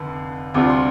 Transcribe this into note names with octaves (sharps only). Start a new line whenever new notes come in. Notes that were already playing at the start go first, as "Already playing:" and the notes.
Already playing: F1 F2 D3
D2 C3 G3 D4 F4 D6
C6